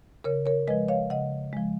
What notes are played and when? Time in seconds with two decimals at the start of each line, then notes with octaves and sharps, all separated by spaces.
0.24 C#3 A#4 C#5
0.46 A#4 C#5
0.67 F3 G#3 B4 D#5
0.88 C#5 F5
1.10 C#3 D#5 F#5
1.53 F3 G#3